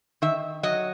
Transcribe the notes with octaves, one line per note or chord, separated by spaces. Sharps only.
D#3 E5
F#3 D#5